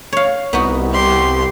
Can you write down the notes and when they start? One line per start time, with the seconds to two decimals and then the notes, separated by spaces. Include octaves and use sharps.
0.13 C#5 F5
0.53 C2 B3 D#4 F#4
0.91 G4 C6